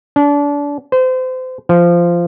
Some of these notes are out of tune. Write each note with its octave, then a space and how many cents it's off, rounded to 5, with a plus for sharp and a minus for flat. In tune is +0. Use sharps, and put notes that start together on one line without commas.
D4 -30
C5 -30
F3 -15